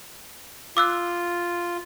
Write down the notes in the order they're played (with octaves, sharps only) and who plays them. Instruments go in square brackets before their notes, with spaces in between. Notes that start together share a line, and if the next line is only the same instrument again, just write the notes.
[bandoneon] F4 [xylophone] D6 E6 F#6